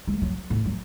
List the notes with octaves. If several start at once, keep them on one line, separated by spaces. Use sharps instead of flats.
G#3
F#3
A2
F#3